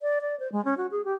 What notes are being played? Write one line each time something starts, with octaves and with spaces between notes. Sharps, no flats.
D5
D5
C5
G#3
C#4
F#4
G#4
G4